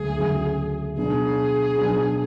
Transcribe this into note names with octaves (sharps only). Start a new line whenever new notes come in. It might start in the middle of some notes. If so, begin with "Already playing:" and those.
Already playing: D2 C#3 F#3 A3 G#4
D2 C#3 F#3 A3
B2 F#3 B3 D4 G#4
B2 F#3 B3 D4